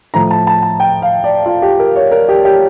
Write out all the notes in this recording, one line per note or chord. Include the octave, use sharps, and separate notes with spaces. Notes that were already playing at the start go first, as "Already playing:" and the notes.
A2 F3 A#5
A5
A5
A5
G5
F5
D5
F4
G4
A#4
C#5
A#4
G4
G4